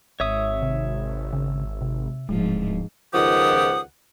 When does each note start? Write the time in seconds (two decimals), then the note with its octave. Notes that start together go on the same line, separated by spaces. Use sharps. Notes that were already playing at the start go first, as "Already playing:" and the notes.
0.20 G#1 C#5 E5 D#6
0.62 C3
1.33 C#3
1.82 C3
2.29 D1 G#2 F3 G#3
3.13 C#2 D#3 F3 G4 F#5 D#6